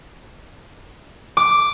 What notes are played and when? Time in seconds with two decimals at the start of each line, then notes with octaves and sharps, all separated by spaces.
1.37 D6